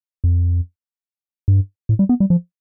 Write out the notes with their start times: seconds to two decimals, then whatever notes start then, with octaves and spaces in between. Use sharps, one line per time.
0.24 F2
1.48 G2
1.89 A2
1.99 G3
2.09 B3
2.20 G3
2.30 F3